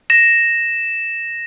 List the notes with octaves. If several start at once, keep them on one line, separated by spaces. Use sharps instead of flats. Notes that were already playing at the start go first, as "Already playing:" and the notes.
A#6 E7